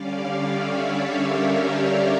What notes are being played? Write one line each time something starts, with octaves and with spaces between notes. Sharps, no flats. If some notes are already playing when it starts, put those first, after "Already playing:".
Already playing: D3 G3 C#4 D5 F5
C#5 E5
G4 A#4
G4 A#4
G4 A#4